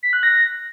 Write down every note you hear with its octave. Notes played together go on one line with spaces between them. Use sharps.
B6
F#6
A#6